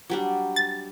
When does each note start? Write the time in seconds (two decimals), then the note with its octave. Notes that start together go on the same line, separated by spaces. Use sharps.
0.10 F#3 G3 D4
0.56 A6